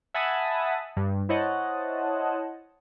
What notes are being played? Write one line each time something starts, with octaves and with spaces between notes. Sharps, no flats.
E5 F#5 G#5 A5 B5 D#6
G2
E4 C5 C#5 D#5 F#5 A5